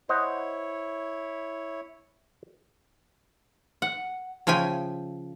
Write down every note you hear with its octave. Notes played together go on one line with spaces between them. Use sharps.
E4 C5 C#5 D#5 F#5
F#5
C#3 F3 E5 G5 G#5